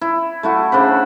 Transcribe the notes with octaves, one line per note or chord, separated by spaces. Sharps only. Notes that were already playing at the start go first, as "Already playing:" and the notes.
E4
A3 E4 F#4
C#3 D4 C5 B5